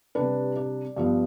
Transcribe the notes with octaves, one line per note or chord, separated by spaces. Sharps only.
C3 G3 D4 B4
D5
G2 F3 B3